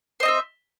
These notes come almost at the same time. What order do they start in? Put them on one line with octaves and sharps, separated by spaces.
C5 D#5 C4 E5